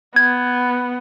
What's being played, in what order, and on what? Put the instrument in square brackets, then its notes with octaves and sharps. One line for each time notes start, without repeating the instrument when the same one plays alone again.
[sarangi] B3 [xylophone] G#6